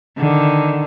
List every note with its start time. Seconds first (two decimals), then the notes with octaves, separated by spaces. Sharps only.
0.18 D3 D#3